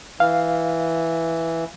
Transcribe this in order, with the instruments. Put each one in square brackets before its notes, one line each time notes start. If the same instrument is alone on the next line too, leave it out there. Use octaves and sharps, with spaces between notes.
[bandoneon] E3 [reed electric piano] F5